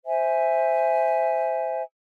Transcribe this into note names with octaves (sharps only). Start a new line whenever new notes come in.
C5 E5 G#5